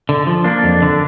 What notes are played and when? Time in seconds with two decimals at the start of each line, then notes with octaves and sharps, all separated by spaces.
0.09 D3
0.27 F3
0.44 A#3 D4
0.64 F2
0.82 D3